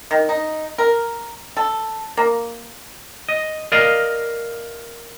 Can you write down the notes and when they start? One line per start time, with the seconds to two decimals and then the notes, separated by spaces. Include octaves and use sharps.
0.11 D#3
0.29 D#4
0.78 A#4
1.57 A4
2.17 A#3
3.29 D#5
3.72 A#4 D5 D#5 F5